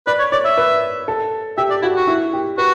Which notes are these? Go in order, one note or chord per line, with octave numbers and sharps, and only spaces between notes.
B4 D5
C#5
C#5 D5
E5
B4
A4
G4 E5
D5
E4 F#4
F#4
E4
G4
F#4 B4